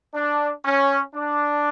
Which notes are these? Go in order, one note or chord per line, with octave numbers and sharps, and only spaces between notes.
D4
C#4
D4